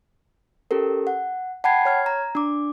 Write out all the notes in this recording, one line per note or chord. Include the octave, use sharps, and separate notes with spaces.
C#4 G4 A4 A#4
F#5
F#5 G5 A5 B5 G#6 C7
C#5 F6 G#6
A#5
D4 D6